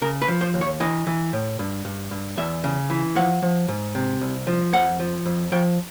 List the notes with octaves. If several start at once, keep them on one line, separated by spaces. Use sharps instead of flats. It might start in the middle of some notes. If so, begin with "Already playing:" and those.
C#3 A#4
B4
F3
C5
D#2
C#5
E3 D#5
E3
A2
G2
G2
G2
E2 E5
C#3
E3
F3 F#5
F3
G#2
C3
C2
F3
F2 F#5
F3
F2
F3 G5